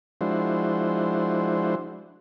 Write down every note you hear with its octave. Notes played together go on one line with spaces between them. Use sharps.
F3 G#3 D4 E4 F#4 C5